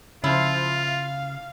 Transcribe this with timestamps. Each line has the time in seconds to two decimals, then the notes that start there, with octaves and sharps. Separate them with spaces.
0.24 C#3 F3 E4 F4
0.78 F5